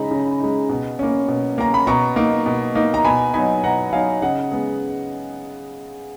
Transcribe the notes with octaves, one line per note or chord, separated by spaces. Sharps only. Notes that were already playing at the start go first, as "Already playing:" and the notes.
Already playing: C#3 G#3 D#4 A#5 B5
C#3
G#3 D#4
B2
A#3 C#4
B2
A#3 C#4 A#5
B5
B2 A#5 C#6
A#3 D#4
B2
A#3 D#4
A#5
B2 G#5 B5
F#3 B3 D#4 G#5 B5
B2 F#5 A#5
F#3 B3 D#4 F5 G#5
C#3 D#5 F#5
G#3 B3